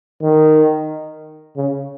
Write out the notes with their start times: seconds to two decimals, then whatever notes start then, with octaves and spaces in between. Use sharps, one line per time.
0.23 D#3
1.56 C#3